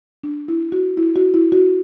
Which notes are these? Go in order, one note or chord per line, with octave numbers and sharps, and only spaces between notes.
D4
E4
F#4
E4
F#4
E4
F#4